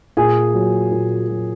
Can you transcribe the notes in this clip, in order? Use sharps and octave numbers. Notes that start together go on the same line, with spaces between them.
A#2 G#4 G#5
F#3
A#2
F#3